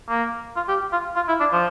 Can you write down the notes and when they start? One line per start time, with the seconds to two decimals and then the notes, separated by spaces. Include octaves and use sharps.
0.09 A#3
0.57 F4
0.68 G4
0.93 F4
1.16 F4
1.28 E4
1.40 D4
1.52 F3